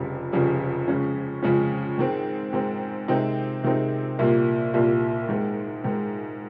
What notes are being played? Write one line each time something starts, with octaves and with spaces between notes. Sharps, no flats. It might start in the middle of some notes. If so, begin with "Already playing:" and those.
Already playing: F1 F2 C#3 G3
F1 F2 C#3 G3
F2 C#3 G#3 C#4
F2 C#3 G#3 C#4
G#2 D#3 G#3 C4
G#2 D#3 G#3 C4
C3 D#3 G#3 C4 D#4
C3 D#3 G#3 C4 D#4
C2 A#2 G3 A#3
C2 A#2 G3 A#3
G#2 D#3 G#3
G#2 D#3 G#3